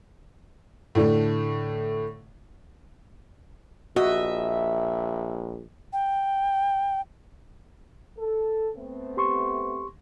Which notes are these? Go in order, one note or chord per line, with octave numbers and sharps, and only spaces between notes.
A2 D3 A3
A#1 F#4 D#5 E5
G5
A4
A3 B3 C4
G4 C6 C#6